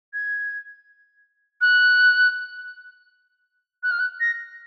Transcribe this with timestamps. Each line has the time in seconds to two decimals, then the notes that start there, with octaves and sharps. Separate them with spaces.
0.13 G#6
1.61 F#6
3.83 F#6
3.91 F6
4.00 F#6
4.20 A#6